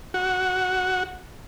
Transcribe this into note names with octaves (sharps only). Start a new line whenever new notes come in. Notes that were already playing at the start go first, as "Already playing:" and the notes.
F#4